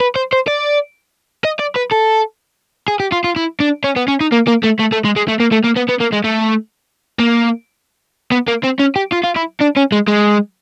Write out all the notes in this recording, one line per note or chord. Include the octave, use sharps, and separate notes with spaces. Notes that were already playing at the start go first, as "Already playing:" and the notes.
B4
C5
C5
D5
D#5
D5
B4
A4
G#4
G4
F4
F4
E4
D4
C#4
B3
C#4
D#4
A#3
A#3
A3
A3
A3
G#3
G#3
A3
A#3
A3
A#3
B3
B3
A#3
G#3
A3
A#3
B3
A#3
C4
C#4
G4
F4
F4
E4
D4
C#4
G#3
G#3